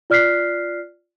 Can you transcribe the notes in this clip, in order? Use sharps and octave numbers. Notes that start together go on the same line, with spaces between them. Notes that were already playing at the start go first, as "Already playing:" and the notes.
F4 D5 F6 F#6 B6 C7